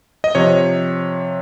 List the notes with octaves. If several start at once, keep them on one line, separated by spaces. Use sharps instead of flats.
D#5
C3 F3 C#5